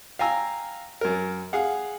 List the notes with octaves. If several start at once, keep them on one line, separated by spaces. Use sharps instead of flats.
F5 G5 G#5 A#5 E6
F#2 A#4
G#4 F5 F#5